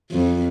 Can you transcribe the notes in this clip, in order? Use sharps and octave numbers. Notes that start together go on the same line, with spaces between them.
F2